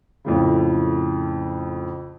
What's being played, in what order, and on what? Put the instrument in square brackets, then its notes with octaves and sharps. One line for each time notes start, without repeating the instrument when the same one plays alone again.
[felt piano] F2 A2 C#3